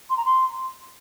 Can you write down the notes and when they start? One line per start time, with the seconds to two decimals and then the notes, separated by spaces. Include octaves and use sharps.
0.10 C6
0.17 A#5
0.25 C6